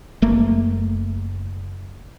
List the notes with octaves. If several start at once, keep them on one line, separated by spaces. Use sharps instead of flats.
F#1 A3 A#3